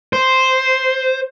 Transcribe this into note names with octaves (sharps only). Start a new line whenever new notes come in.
C5